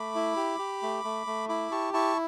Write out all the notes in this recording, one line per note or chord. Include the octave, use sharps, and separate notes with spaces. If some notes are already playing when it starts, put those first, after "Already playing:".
Already playing: A3 B5 D6
E4
G4
G4
A3
A3
A3
E4 B5 D6
G4 A5 C#6
E4 A5 C#6